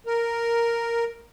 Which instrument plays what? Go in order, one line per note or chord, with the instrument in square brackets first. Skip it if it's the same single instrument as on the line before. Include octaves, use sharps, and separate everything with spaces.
[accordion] A#4